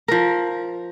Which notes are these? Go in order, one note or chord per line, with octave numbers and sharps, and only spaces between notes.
F3 A#4